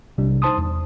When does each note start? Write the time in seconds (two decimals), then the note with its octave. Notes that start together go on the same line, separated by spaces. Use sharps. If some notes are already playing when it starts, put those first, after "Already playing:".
0.18 B1 C3 G3 D4
0.42 D#4 C5 A5 C6 D#6
0.57 E2